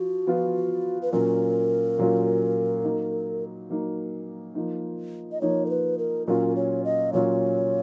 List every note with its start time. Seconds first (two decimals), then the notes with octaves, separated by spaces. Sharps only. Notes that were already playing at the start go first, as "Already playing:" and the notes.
Already playing: F3 F#4
0.27 F3 B3 F4
1.02 B4
1.12 A#2 F#3 C#4 F4 A#4
1.98 A#2 F#3 C#4 F4
2.84 F#3 A#3 D#4
3.70 F#3 A#3 D#4
4.55 F3 A#3 D#4
5.32 D#5
5.41 F3 A#3 D#4 C#5
5.66 A#4
5.70 B4
5.98 A#4
6.27 A#2 F#3 C#4 F4 A#4
6.56 C#5
6.85 D#5
7.13 A#2 F#3 C#4 F4 C#5